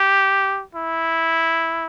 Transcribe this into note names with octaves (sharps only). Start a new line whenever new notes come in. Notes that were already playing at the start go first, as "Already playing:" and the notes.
Already playing: G4
E4